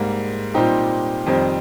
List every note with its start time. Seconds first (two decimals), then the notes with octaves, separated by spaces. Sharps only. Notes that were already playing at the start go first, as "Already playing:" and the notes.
Already playing: G#2 G3 A#3
0.54 A#2 G3 C4 D#4 G4
1.26 F2 D#3 G3 C4